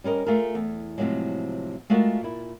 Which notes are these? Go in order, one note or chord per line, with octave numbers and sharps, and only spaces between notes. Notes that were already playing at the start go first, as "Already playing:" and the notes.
G3 C#4 A#4 D#5
A3 F4 G#4 A#4
E2
A2 C3 F3 F#3 G#3
G#3 A3 F4 F#4 A4 A#4
A#2 E4